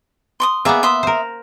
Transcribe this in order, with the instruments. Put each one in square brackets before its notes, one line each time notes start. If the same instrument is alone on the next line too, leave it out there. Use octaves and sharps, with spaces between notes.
[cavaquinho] C6 C#6 D#6
[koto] A#3 B3 [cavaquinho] G#4 D5 E5
[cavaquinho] E5 C6 D#6
[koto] A#4 C5